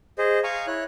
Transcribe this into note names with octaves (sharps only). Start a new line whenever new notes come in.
G#4 C5 D#5
F5 G#5 A#5 C#6
E4 C#5 F#6